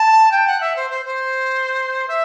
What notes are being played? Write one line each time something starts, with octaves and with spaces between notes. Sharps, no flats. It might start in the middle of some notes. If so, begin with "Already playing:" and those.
Already playing: A5
G5
F#5
E5
C5
C5
C5
E5